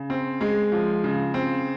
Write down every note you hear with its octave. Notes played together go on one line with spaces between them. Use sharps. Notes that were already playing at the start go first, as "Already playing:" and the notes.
Already playing: C#3
C4
G#3
F3
C#3
C4